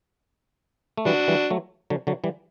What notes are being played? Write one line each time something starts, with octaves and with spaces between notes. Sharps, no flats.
A3
E3 G3 D4 F#4
E3 G3
F#3 A3
D3 F#3
D3 F#3
E3 G3